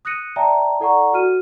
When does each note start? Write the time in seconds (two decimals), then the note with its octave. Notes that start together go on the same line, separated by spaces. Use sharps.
0.05 D#6 F#6 A#6 C#7 D#7
0.36 D5 E5 G5 A5 A#5
0.80 E4 A4 D5 F#5 A#5 C#6
1.13 F#4 F6 D#7